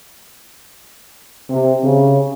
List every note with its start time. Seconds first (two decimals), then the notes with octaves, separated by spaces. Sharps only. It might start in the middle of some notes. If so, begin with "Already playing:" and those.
1.49 C3
1.84 C#3